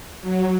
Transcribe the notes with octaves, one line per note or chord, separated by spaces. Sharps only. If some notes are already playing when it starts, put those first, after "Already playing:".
F#3